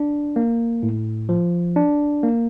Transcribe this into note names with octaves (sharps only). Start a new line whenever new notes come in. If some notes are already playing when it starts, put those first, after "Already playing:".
Already playing: D4
A#3
A2
F3
D4
A#3